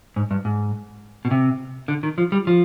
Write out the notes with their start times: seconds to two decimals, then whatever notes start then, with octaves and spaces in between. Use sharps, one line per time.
0.16 G#2
0.31 G2
0.45 G#2
1.25 B2
1.31 C3
1.88 D3
2.03 D#3
2.18 F3
2.32 G3
2.47 F3